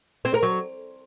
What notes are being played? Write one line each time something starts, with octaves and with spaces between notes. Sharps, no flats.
C4
A#4
F#3